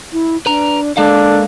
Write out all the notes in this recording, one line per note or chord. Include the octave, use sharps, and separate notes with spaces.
E4
D4 B4 A#5
G#3 A#3 D4 A4 F5